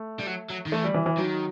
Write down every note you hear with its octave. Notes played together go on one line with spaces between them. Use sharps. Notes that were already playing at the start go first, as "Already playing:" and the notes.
Already playing: A3
G3
F#3
F#3
D#3
E3 A3
G3
E3
E3
D#3 F#3